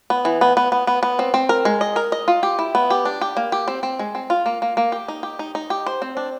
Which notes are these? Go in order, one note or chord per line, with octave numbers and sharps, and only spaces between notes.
B3
E3
B3
B3
B3
B3
B3
C4
C4
A#4
G#3
D#5
A#4
D#5
F4
G4
E4
B3
G4
D4
G4
A#3
G4
C4
C4
G#3
C4
F4
A#3
A#3
A#3
G4
D#4
G4
D#4
D#4
G4
C5
C4
D4